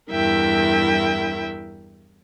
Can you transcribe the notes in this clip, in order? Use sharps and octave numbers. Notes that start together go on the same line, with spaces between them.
E2 G2 E4 A#4 E5 G5